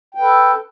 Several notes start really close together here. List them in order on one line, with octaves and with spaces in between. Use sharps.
G5 B4 A4